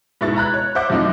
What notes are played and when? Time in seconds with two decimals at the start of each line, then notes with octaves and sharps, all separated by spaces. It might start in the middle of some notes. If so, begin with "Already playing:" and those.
0.21 G#2 B2 E4 C#6 A6
0.36 A#5 B5 F#6 G#6
0.54 C#5
0.75 C5 E5 F#5 D6 G6
0.90 F#2 F3 A3 C4 D#4